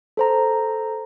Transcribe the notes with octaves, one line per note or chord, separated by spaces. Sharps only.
A4 C5 A#5